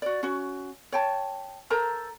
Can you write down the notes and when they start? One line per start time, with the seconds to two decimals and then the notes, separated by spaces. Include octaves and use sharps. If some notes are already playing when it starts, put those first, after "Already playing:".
0.02 F#4 D5
0.23 C#4 F#4
0.92 C#5 G5 A5
1.70 A4 A#4 C5 A#5